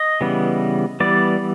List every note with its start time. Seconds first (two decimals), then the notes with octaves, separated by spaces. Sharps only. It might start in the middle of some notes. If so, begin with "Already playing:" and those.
Already playing: D#5
0.21 C#3 E3 G3 B3
1.00 E3 G3 B3 D5